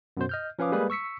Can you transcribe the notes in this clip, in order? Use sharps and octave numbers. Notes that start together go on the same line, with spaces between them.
F#2 B2 C5
D#5 F6 G6
F3 C#4 B4 F5 D6 D#6
G3 G#3 A#3 G#4 B4
C#6 E6 B6 C#7